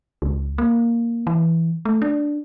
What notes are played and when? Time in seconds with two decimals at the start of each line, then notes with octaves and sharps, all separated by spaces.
0.22 C#2
0.58 A#3
1.27 E3
1.85 A3
2.02 D4